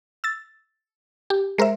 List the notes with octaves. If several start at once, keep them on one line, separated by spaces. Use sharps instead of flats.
E6 A6
G4
G#3 A#4 C5 E5